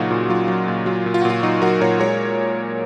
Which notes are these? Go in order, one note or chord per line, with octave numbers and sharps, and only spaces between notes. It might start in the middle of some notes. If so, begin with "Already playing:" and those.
Already playing: A#2 C#3 F#3 D#4 F4 F#4
A#2
F#3 F4
F#3
A#2
F#3 F4
A#2
F4
F#4
A#2
F4
F#3 D#4 F#4
F#3 F#4 A#4
A#2 A#4 C#5
G#3 A#4 C#5